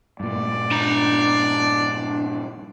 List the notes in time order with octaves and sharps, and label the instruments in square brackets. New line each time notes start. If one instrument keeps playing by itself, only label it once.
[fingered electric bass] G2 A#2 [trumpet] D5
[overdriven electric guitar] D4 A#5